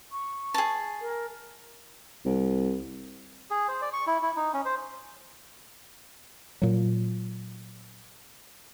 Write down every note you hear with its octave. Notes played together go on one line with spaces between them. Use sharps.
C#6
G#4 A5
A#4
C2
G#4
C5
D5
C#6
E4
E4
D#4
C#4
C5
A#2 F#3